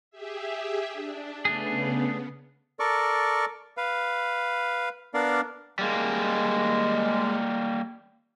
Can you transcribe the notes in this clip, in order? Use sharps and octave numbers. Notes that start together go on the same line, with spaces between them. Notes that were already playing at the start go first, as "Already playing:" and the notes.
G4 G#4 E5
D4
C#3 A3 B3 D4 G#4
A4 A#4 D5 C#6
B4 F5
B3 D4 A#4 D5 F5
G3 G#3 A#3